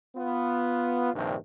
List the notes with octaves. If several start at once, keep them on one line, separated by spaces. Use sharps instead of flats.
B3 F4
A#1 G2 C3 D#3